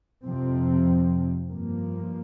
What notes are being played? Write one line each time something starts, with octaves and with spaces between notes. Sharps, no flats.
F2 C3 F3 C4
G2 F3 A#3